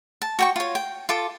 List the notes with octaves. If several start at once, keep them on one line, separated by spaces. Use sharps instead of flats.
A5
F#4 G5 C#6
F4 C#5
G5
F4 A4 D6